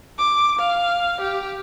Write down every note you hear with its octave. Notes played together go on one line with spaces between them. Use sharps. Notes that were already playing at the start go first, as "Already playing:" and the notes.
D6
F5
G4